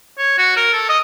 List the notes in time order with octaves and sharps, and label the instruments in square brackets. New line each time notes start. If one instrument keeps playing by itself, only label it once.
[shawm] C#5
F#4
A#4
A4
D#5